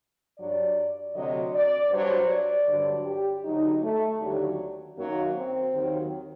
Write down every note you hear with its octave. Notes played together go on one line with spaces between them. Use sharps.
G2 F#3 D5
D2 C3 F#3 D#5
D5
G2 F#3 C5
D5
G2 D3 F#3
G4
D2 D3 F#3 D#4
A3
D#2 D3 F#3 G3
F#2 D#3 F#3 A#3
C4
D#2 D#3 F#3